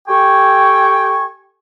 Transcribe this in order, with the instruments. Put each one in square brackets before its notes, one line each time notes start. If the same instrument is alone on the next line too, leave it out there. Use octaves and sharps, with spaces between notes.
[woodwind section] G4 A4 G5 G#5 C#6